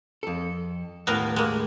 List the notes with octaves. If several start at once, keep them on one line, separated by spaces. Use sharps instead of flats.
F2 A4
D#2 A2 B3 A#4
G#3 A#3